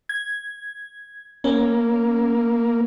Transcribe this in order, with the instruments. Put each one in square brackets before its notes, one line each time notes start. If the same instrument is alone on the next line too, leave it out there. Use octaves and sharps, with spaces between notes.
[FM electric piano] G#6
[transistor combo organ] A#3 [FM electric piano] C#4